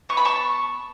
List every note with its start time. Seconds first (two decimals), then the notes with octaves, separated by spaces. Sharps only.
0.09 B3 C#6
0.17 B5
0.25 A5 C#6